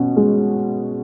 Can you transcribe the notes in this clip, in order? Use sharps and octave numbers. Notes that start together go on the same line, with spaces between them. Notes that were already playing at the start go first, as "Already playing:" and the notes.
Already playing: B2 C#4
G#3